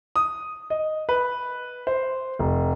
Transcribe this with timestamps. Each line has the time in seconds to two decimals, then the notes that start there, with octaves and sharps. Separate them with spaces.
0.16 D#6
0.70 D#5
1.09 B4
1.87 C5
2.39 F1